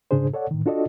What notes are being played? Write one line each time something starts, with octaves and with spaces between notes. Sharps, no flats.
G#2 C#3 D4 G#4 C5
A4 C#5 D5 F#5
A2 D#3
D4 F4 F#4 A4 D5 D#5